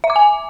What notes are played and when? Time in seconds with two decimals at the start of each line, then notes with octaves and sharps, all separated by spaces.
0.04 E5
0.10 D6
0.16 G#5